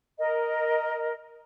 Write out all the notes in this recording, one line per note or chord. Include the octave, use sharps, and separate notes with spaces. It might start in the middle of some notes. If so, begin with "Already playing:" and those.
A#4 D#5